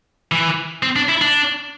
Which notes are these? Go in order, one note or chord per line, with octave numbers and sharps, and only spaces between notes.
E3
C4
D4
E4
D4